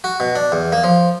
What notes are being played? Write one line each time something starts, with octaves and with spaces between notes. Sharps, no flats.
F#4
B2
D4
E2
A#3
F3